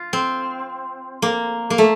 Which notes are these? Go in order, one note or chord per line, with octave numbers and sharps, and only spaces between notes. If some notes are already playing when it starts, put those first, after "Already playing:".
Already playing: F4
C4
A#3
A#3
A3